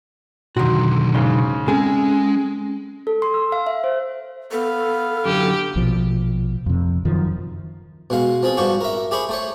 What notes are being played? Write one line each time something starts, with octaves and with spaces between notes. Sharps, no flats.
B1 D3 D#3 F#4 C6
G#2 C#3 C6
G#3 C4 C#4 G#4 A4 G#5
A4
C6
E6
F5
E5
C5
B3 A4 F5
F#2 D3 F#3 G4
A#1 B2 F3
F2 C3
F#2 D#3 F3
B2 G#3 F5
F3 C4 G#4
G2 F3 F#4 G4 C#6
A#4 E5
G4 G#4 C5 B5 C#6
A3 C5 C#5